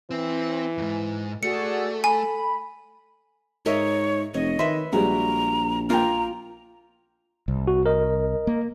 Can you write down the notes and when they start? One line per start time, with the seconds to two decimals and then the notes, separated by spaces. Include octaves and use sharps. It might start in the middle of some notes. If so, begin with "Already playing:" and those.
0.11 E3 C4
0.78 F2 G#2
1.43 A3 F#4 G#4 A4 D5 C#7
2.04 G#5 B5
3.66 G#2 A#4 C#5 D#5 E5
4.34 F1 C#5 D#5
4.59 D#3 B4 E5 C6
4.93 A#1 G3 G#3 F#4 A#5
5.90 A#3 F4 G5 A#5
7.48 C2
7.67 F#4
7.86 A#4 D#5
8.47 A#3